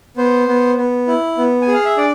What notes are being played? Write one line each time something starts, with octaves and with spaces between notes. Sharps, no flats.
B3 C5
B3
B3
E4
B3
G#5
G#4
F5
E5
D4 D5